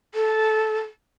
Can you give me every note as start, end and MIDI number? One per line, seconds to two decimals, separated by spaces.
0.15 0.79 69